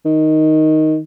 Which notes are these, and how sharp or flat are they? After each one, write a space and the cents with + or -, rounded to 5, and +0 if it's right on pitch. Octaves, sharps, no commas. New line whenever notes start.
D#3 +5